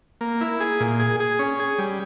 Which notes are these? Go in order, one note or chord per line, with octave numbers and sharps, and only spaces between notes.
A#3
E4
G#4
A#2
G#4
G#4
C#4
G#4
G3